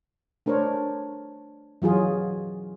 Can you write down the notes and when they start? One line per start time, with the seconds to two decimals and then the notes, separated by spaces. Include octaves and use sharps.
0.46 A3 D4 A#4 C5 C#5
1.82 E3 F#3 F4 G#4